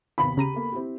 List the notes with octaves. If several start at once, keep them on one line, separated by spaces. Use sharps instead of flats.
D#2 C3 B3 B5
C#3 G4 A#5 D#7
A#3 B3 A4
C4 E4 G4